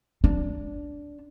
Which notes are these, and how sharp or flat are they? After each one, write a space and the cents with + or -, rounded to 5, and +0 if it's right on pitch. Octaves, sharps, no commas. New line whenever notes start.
D4 -10